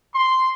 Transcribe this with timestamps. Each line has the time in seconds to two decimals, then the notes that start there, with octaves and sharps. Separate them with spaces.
0.15 C6